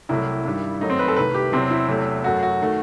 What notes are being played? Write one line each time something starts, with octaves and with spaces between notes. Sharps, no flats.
C2 C3 F#3 A3 E4
G2 D#3 G3
F#2 D#3 F#3 A3 D#4
C4
B4
A4
C2 C3 D#3 A3 B4
G4
E2 C3 F#3 C4
E4
E2 C3 F#3 A3
F#2 F#3 A3 F#4
F#4
D#3 A3